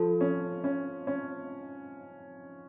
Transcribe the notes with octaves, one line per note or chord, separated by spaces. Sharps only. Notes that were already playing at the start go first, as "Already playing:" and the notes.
Already playing: F3 F4 A4
C#4
C#4
C#4